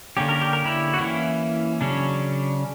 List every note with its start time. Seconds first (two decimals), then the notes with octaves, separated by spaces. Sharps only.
0.17 D3 A#3 C#4 G4
0.29 A#4
0.41 G4
0.53 A#4
0.64 E4 G4
0.94 F#4
0.98 E3 A#3 C#4 E4
1.81 C#3 F#3 C#4 D4